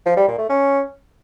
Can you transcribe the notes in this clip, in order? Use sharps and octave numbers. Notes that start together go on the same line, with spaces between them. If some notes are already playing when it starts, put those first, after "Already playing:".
F3
G3
A#2
A3
C#4